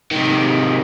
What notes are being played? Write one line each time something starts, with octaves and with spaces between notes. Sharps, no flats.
C3 D#3